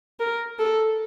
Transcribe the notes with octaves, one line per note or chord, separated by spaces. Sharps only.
A#4
A4